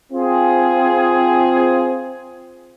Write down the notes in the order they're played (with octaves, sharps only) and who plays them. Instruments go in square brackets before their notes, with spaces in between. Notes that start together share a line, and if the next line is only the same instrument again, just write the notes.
[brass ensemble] C4 F4 G#4